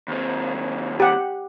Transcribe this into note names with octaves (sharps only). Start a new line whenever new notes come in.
D#2 C4
G4 F#5